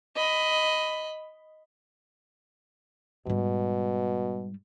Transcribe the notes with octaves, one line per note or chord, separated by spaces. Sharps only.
D#5 B5
G#2 B2 G3